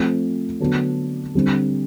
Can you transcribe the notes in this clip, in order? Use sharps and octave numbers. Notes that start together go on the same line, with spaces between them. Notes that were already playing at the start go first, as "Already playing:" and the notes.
Already playing: F3 A3 C4
D3 F#3 B3 D4
D3 G3 C4